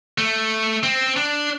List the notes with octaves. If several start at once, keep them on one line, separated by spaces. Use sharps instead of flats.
A3
C4
D4